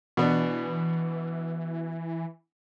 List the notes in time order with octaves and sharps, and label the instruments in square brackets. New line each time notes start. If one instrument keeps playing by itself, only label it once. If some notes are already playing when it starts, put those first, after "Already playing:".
[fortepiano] B2 B3 D4 [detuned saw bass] E3